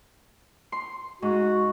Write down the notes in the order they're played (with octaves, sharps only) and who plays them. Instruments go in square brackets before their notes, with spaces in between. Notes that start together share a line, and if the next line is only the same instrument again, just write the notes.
[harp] C6
[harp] G#2 [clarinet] F#4